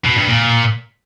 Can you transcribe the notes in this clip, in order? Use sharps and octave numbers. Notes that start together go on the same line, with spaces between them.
B2
G2
A#2